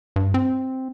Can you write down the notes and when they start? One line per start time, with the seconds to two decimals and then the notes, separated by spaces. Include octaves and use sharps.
0.16 G2
0.34 C4